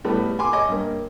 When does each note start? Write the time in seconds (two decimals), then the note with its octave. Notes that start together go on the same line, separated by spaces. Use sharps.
0.04 A2 G3 A3 B3
0.39 G#5 C6 D6
0.53 C#5 D#5 D6
0.68 G2 A#3